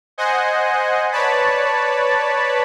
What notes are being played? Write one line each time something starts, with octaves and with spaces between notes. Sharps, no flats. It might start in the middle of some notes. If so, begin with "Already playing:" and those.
C5 D#5 F#5 G#5
B4 C#5 D5 A5 B5